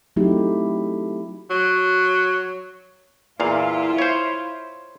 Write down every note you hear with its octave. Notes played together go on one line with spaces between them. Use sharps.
F#3 A3 C4 D#4 E4 G4
F#3
E2 A#2 E4 F4 F5
C5 C#5